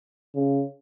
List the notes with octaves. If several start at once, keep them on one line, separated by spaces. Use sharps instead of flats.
C#3